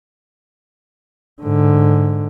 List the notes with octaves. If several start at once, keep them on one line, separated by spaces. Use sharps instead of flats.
G#2 D3